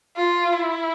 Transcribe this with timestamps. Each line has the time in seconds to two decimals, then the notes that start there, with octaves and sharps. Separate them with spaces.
0.17 F4
0.52 E4